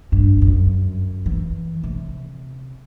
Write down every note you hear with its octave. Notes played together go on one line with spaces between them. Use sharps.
G2
F#2
E3
C3